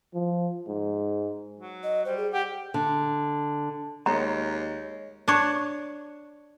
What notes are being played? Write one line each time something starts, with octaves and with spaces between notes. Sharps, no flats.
F3
G#2
F#3
D#5
G3 C5
G#4
G4 F#5
D3
D#2 G#3 C#5 D#5 A#5
D4 C#5